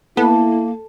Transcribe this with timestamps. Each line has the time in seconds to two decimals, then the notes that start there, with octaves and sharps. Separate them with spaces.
0.17 A#3 B3 E4 A4